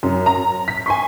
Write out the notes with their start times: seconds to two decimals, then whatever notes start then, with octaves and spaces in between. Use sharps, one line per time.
0.03 F#2
0.26 A#5
0.68 B6
0.86 G#5 C6 C#6